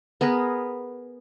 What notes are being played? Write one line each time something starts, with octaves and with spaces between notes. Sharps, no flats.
B3 G#4 A#4 B4